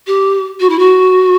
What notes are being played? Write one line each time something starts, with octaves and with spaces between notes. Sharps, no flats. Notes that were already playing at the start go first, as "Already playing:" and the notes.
G4
F#4
E4
F#4